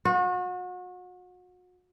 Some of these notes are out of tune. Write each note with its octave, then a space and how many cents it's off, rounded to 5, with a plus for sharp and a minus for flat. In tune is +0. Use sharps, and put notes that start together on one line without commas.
F#4 -35